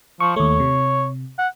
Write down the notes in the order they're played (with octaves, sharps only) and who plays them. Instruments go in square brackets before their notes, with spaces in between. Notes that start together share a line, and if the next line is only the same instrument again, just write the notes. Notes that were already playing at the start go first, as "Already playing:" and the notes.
[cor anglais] F3 [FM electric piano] C#6
[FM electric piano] D#2 A3 [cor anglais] C#5
[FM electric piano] C3
[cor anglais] F#5